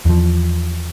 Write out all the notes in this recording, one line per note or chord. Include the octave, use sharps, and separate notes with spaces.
E2 F3